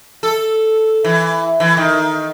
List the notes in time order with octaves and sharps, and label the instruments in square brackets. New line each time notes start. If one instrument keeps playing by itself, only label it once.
[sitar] A4
E3
E3
D#3